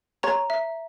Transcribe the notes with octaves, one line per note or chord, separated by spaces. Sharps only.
C#5 A#5
E5